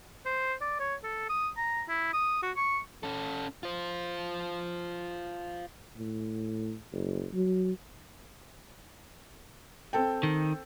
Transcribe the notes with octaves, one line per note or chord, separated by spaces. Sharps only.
C5
D5
C#5
A4
D#6
A#5
E4
D#6
F#4
C#6
C#4 A4
F4 C5
A2
F#1
F#3
C4 A4 G5
D#3